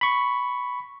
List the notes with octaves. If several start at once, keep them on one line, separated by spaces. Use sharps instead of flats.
B5 C#6